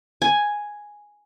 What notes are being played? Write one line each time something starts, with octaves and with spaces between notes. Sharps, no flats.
G#5